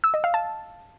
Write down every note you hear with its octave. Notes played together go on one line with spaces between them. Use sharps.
E6
D#5
F5
A5